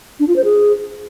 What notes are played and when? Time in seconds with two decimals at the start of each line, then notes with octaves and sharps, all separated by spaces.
0.20 D4
0.28 F4
0.36 C5
0.44 G#4